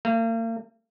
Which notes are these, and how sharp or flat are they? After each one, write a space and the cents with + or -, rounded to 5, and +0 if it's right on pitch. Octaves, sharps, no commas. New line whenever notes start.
A#3 -40